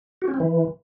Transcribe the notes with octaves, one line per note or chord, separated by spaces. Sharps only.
F#4
C#4
C4
E3